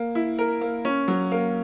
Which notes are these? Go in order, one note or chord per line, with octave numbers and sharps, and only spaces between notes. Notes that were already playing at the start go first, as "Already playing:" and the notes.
Already playing: A#3
E4
A#4
A#3
C#4
F#3
A#3